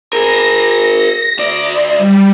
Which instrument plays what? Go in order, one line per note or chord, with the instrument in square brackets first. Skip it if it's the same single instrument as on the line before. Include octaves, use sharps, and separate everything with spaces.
[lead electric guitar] G#4 A#4 [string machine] A#6
[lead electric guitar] D2 D5
[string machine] G3